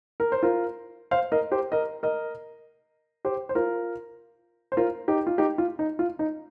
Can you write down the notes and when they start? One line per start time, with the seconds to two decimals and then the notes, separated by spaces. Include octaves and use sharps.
0.20 A#4
0.32 C5
0.43 F4 A#4
1.11 C5 F5
1.32 A#4 D#5
1.52 G4 C5
1.72 A#4 D#5
2.03 A#4 D#5
3.25 G4 C5
3.49 C5
3.55 F4 A#4
4.72 C5
4.77 F4 A#4
5.08 D#4 G4
5.27 F4
5.38 D#4 G4
5.58 F4
5.79 D#4
5.99 F4
6.19 D#4